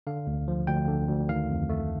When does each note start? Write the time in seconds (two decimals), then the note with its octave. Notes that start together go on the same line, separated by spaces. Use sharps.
0.07 D3 F5
0.27 D2
0.48 F3
0.67 D2 G5
0.88 D3
1.08 D2
1.29 D#3 F5
1.49 F2
1.69 A3